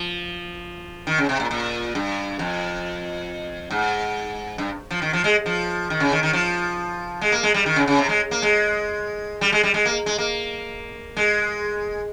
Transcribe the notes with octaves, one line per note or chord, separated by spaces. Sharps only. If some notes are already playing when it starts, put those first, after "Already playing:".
Already playing: F3
D#3
C#3
C3
A#2
A#2
G2
F2
G#2
G2
F3
D#3
F3
G#3
F3
D#3
C#3
D#3
D#3
F3
G#3
A#3
G#3
G3
D#3
C#3
C#3
C3
G#3
A#3
G#3
G3
G#3
G3
G#3
A#3
G#3
A#3
G#3